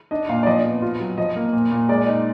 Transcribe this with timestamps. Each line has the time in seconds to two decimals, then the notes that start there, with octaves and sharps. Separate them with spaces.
0.11 D4 D#5
0.29 A#2 F5
0.43 D5
0.46 F3 D#5
0.64 B3
0.82 F4
1.00 F#3
1.18 F3 D#5
1.36 A#3
1.53 A#2
1.71 A#2
1.89 G#3 D5
2.07 D#4